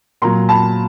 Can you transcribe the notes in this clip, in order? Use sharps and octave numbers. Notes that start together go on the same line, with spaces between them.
A#2 F#3 A#5 C6
A5 B5